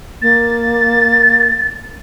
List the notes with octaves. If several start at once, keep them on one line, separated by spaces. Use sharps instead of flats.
A#3 A6